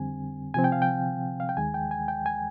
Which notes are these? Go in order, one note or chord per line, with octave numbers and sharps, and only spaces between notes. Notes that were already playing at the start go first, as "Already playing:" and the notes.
Already playing: F2 D3 G3 C4 G#5
C3 F3 C4 G#5
G5
F5
G5
F5
G5
D#2 D#3 G#3 G#5
G5
G#5
G5
G#5